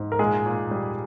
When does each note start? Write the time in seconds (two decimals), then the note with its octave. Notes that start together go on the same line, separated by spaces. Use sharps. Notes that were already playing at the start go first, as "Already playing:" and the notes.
Already playing: G#2
0.12 A#4
0.19 A#2 G#3 G#4
0.46 A#2
0.71 G3